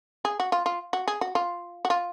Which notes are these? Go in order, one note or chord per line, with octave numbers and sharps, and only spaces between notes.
G#4
F#4
F4
F4
F#4
G#4
F#4
F4
F#4
F4